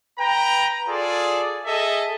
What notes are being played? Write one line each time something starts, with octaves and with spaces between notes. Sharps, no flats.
B4 G5 A#5
F4 G#4 A4 D5
G#4 A4 D#5 E5